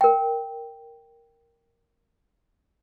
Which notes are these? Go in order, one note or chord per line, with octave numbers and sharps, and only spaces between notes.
A#4 G5